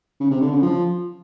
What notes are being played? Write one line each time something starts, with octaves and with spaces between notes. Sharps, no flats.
C#3
C3
D3
C#3
F3